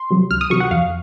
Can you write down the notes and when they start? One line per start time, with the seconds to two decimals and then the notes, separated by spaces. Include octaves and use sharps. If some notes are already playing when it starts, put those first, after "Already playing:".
Already playing: C6
0.10 C3 F#3
0.30 C#2 F6
0.41 D#6
0.50 C3 F#3 C#6
0.60 F#5
0.71 F2 F5